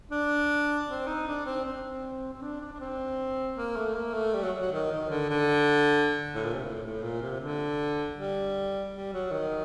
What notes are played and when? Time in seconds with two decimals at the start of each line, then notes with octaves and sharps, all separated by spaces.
0.11 D4
0.89 C4
1.07 D#4
1.27 D4
1.46 C4
1.65 C4
2.33 C4
2.42 D4
2.61 D4
2.73 D4
2.80 C4
3.56 A#3
3.76 A3
3.95 A#3
4.14 A3
4.34 G3
4.43 F#3
4.62 F#3
4.72 D#3
4.91 D#3
5.10 D3
5.30 D3
6.35 A2
6.44 A#2
6.54 C3
6.63 A2
6.82 A2
7.02 A#2
7.22 C3
7.40 D3
8.17 G3
8.94 G3
9.13 F#3
9.32 D#3